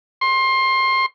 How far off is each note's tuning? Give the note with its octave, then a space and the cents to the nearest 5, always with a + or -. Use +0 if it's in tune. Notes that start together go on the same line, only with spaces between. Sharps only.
C6 +25